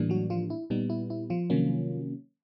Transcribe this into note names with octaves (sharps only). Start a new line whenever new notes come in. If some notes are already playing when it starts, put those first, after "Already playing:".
Already playing: A2 E3 G3 A#3 D4
F#3 F#4
F3 F4
E4
A#2 G3 B3 D#4
E4
E4
F3 F4
C3 D#3 F#3 A#3 C#4